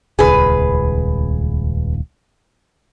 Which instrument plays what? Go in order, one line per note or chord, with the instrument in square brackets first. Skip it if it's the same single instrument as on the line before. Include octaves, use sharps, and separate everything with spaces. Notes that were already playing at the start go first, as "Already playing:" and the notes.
[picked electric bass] D#1 C#2 [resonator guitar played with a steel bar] G#4 B4